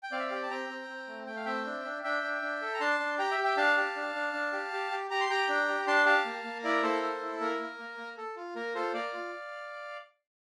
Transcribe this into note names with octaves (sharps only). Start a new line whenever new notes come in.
G5
C4 D5 F5
E5
F5
G4 G5
A5
C4 G5 A#5
C4
C4
A3
A3 G5
F5
C4 E5 G5
D4
D4
D4 E5 G5
D4
D4
A4
A#5
D4 A5 C6
D4
G4 G5 A#5
E5 G5
G4
E5 G5
D4 F5 A5
G4
D4
D4
D4
G4
G4
G4
G4 A#5
C6
G4 G5 A#5
D4
G4
D4 A5 C6
G4 F5 A5
A#3
A#3
E4 A#4 D5
A#3 A4 C5
A4
E4
A#3 A#4
A#3
A#3
A#3
A4
F4
A#3 A#4
F4 A4 C5
A#3 D5 F5
F4